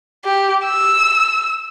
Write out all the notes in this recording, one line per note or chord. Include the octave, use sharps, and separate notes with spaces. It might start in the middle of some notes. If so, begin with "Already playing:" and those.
G4
E6